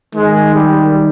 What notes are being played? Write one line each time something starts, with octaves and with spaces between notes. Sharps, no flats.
D#3 G#3
G3